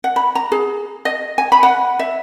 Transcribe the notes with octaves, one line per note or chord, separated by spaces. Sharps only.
F#5
B5
A#5
G#4
D#5
G#5
B5
F#5
E5